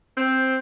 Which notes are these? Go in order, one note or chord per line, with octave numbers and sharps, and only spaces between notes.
C4